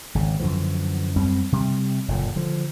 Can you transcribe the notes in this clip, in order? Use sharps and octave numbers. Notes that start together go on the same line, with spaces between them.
G#1 C#3
F#2 D3 E3 F3
F#2 G3 C4
C3 G3
F#1 A#2 D3
D3 F3